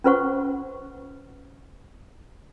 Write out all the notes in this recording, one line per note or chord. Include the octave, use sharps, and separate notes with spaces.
C#4 F4 B4 C5 F#5 C#6